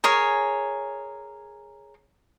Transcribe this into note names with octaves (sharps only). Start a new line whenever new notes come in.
G#4 A#4 C#5 G#5